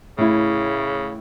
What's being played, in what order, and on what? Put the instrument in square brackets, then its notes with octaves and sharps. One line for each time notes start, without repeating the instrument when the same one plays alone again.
[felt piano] A2 E4 [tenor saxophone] C#3